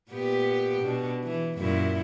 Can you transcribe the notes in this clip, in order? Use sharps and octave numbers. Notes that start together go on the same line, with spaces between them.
A#2 B3 G4
B2 D4
E3
F#2 A#2 E4